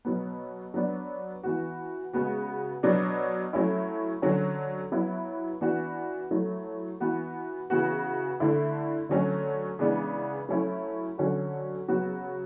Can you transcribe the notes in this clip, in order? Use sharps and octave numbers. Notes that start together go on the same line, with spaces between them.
B2 F#3 B3
F#3 B3 D4
E3 B3 F#4
C#3 G#3 B3 F#4
B2 F#3 B3 D4
F#3 A3 C#4 E4
D3 F#3 C#4
F#3 B3 E4
E3 B3 D4 F#4
F#3 A3 E4
E3 B3 F#4
C#3 E3 B3 F#4
D3 A3 E4
D3 F#3 A3 C#4
C#3 E3 G#3 B3 D4
F#3 A3 C#4 E4
D3 F#3 C#4 F#4
C#3 F#3 B3 F#4